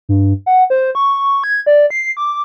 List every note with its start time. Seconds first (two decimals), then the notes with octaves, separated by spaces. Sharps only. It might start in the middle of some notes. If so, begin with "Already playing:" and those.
0.09 G2
0.46 F#5
0.70 C5
0.95 C#6
1.44 G#6
1.66 D5
1.90 C7
2.17 D6